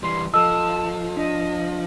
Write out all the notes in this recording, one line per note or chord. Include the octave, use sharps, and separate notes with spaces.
E3 G3 C6
F3 A4 D#5 A5 E6
D4 D#5